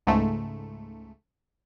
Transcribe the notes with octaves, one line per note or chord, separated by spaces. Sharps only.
C#2 G#2 A3